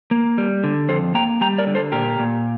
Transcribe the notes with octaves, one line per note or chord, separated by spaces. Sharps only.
A#3
G3
D3
F2 A4 C5
A#3 G5 A#5
G3 G5 A#5
A#4 D5
D3
A4 C5
A#2 G4 A#4
A#2